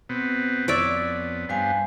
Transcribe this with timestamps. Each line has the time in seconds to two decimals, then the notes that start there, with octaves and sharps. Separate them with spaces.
0.09 B2 B3 C4
0.68 F2 B3 C#5 D5 E5
1.49 G2 G3 B3 C5 F5 G#5